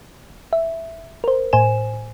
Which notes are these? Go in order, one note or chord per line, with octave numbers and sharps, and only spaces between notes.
E5
A#4 C5
A2 C5 G#5 E7